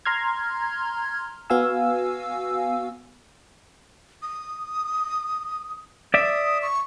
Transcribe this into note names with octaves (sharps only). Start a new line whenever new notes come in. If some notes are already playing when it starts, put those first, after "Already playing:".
A#5 C6 F6 G#6
B3 F#4 F5 G#5 E6
D#6
D5 E5 D#6
C#6